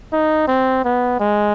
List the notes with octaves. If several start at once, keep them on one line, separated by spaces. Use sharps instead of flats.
D#4
C4
B3
G#3